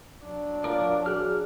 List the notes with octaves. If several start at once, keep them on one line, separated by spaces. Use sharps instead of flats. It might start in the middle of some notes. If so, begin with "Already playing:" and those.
F#3 D4
F4 A#4 D5
F#4 G#4 F6 F#6